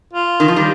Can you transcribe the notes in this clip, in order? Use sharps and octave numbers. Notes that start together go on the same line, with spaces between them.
F4
D#3
F3
D#3 G3